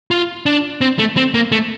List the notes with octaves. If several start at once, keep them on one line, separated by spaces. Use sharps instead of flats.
F4
D4
C4
A3
C4
A#3
A3